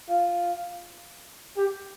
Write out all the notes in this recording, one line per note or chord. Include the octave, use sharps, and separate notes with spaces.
F4
G4